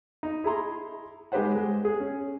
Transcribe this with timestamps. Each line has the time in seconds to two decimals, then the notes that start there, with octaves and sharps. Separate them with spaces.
0.23 D#4
0.44 E4 G#4 A#5 C6
1.32 G#3 D#4 G4 B4 C5 F#5
1.55 G#3
1.85 G#4
2.00 C#4